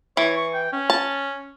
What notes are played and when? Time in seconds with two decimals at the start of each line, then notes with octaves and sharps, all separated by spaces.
0.17 E3 C#5
0.37 C#6
0.54 G5
0.73 C#4
0.90 A5